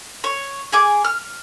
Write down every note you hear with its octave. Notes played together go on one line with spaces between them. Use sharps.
C#5
G#4 G#5 D6
F6